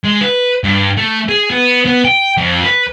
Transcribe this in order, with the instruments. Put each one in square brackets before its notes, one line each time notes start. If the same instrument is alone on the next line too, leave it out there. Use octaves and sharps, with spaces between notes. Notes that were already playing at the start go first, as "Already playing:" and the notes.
[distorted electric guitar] G#3
B4
G2
A3
G#4
B3
B3
G5
F2
B4